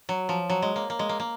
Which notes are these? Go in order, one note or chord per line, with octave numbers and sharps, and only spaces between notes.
F#3
F3
F#3
G#3
A#3
A#3
G#3
A#3
A#3